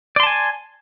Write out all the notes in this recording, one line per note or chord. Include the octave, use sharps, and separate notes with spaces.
D5 G#5 A5 C6